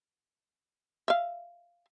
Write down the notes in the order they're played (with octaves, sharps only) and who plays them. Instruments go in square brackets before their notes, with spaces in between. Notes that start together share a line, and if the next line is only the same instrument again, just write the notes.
[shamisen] E5 F5